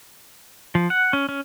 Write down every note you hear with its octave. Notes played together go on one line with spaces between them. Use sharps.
F3
F#5
C#4
C#4